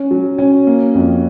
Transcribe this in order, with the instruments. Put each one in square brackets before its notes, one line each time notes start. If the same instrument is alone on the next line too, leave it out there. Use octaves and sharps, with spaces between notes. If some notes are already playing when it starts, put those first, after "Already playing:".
Already playing: [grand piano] C#4
F#3
C#4
A#3
F2